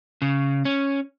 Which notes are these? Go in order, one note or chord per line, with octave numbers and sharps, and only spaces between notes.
C#3
C#4